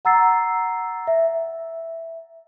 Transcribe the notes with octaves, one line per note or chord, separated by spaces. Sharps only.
F#5 A#5 E6 A6 C7
E5